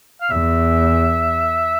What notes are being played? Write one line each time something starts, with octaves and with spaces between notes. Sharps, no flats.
F5
E2 E5